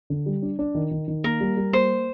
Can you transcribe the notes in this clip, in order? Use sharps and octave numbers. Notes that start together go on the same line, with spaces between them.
D3
G3
D4
D4
D#3
D#3
D#3
A#3 A#4
G3
G3
A#3 C5